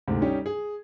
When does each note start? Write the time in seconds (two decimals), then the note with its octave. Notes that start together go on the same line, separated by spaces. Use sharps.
0.08 D2 G#2 C3 C4
0.22 G3 C#4 D#4 G4
0.46 G#4